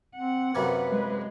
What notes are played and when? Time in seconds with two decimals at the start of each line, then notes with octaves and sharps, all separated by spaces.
0.16 C4 F#5
0.55 F#2 C3 A#3 B4
0.89 G#3